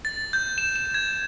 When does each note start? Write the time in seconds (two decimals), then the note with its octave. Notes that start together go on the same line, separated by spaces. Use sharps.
0.05 A6
0.33 G6
0.58 E7
0.76 E7
0.94 G#6